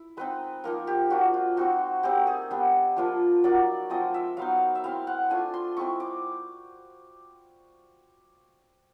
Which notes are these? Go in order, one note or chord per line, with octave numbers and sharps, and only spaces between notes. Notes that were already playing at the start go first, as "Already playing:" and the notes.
Already playing: E4
G#3 C4 D#4 B4
F3 A#3 D#4 A#4
G4
A#3 D4 F4 F#4
F4
G#3 C4 D#4 F#4
G3 C4 D#4 G4
G#4
G3 B3 D4
F3 A#3 D4 F4
F#3 A#3 D#4 D5
F3 G#3 C4 D#5
E5
F#3 B3 D#4 F5
E5
G#3 C4 E4 F5
F#5
A3 D4 F4 G#5
C6
G#3 C4 E4 C#6
D6